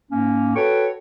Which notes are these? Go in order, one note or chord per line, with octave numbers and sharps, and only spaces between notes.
G#2 A#3 C#4
F#4 A4 B4 C#5 G5 C#6